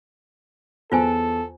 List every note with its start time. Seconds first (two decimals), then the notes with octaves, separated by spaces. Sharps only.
0.92 E2 F4 A4 C5 G#5